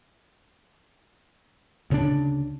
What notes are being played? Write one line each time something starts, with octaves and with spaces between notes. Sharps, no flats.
D2 C#3 B3 D4